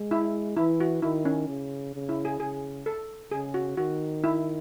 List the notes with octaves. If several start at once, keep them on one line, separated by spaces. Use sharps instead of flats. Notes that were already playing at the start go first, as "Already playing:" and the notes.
Already playing: G#3
E4
E3 E4
F#4
D#3 E4
C#4
C#3
C#3
E4
G#4
C#3 G#4
A4
C#3 G#4
F#4
D#3 F#4
E4